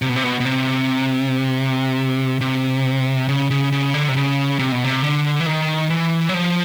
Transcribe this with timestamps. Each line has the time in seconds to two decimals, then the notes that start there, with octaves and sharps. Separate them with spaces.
0.02 C3
0.09 B2
0.16 C3
0.24 B2
0.40 B2
0.45 C3
2.41 C3
3.29 C#3
3.51 C#3
3.72 C#3
3.94 D3
4.08 C3
4.16 C#3
4.59 C3
4.72 B2
4.84 C3
5.02 D3
5.40 E3
5.46 D#3
5.90 E3
6.29 F#3
6.34 F3